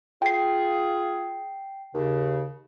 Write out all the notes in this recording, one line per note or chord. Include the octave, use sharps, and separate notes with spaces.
F4 G#4 G5 C7
D#2 C#3